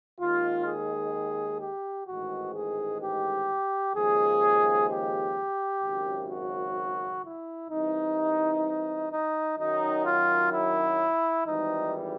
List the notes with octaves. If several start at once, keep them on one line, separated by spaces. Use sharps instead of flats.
D#2 D#3 G#3 F4
G#4
G4
A1 G#2 D#3 G#3 F#4
G#4
G4
D#2 C#3 F3 G#3 G#4
G4
G#1 F#2 C#3
F#4
E4
C2 C3 E3 D#4
D#4
F#2 D#3 F#3 D#4
F4
E4
G#1 G#2 E3 G3 D#4